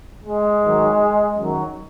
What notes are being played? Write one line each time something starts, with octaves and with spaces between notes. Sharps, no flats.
G#3
G#2 D#3 F#3
F#2 D#3 F#3